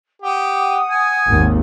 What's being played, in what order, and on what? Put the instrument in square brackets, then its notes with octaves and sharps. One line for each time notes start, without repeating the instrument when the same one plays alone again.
[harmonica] G4 [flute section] F#5 D#6
[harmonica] G#5
[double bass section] G#1 D#2